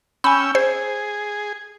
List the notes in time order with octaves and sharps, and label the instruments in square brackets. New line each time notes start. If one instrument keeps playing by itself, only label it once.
[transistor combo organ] C#4 G5 E6 [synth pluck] G#5 B5
[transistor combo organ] G#4 [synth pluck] C5